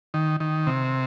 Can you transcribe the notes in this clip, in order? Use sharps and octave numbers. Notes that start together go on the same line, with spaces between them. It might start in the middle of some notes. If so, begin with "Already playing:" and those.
D#3
D#3
C3